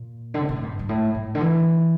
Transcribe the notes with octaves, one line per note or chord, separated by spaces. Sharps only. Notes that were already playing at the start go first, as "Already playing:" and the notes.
Already playing: A#2
D3
C3
A#2
A2
G2
G2
A2
A2
D3
E3